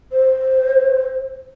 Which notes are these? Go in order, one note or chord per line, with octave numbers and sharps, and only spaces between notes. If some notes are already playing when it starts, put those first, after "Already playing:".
C5